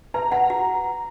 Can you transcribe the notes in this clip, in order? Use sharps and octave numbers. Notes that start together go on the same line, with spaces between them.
B4 A#5
F#5 A#5
F#4